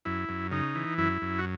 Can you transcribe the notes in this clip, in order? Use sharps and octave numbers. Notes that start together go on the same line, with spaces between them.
F#2 E4
F#2
C#3 D#4
E3
F#2 E4
F#2
F#4